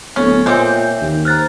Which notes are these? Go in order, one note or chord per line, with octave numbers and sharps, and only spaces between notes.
D1 B3 C#4 A4
A#2 G#3 C4 C#5 E5 G#5 D6 G6
D#2
C5 A#5 F6 F#6 A6